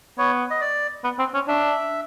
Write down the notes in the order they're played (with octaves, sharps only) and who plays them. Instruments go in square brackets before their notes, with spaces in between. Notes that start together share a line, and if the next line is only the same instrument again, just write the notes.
[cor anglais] B3 [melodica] C#5
[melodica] D#5
D5
[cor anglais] B3
C4
C#4
[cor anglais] D4 [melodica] E5